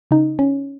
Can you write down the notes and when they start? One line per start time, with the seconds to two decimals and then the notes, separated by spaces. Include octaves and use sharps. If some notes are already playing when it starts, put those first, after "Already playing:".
0.11 C#3 D#4
0.39 C#4